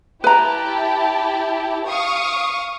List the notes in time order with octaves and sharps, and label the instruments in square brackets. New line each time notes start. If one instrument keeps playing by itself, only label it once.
[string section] E4 G4 A5 [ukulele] B4 A#5
[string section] F5 C#6 D#6